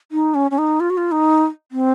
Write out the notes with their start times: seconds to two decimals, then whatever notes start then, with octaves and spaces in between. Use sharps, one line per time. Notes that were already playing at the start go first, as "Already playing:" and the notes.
0.12 D#4
0.35 C#4
0.51 C#4
0.58 D#4
0.80 F4
0.90 F#4
0.97 F4
1.12 D#4
1.72 C4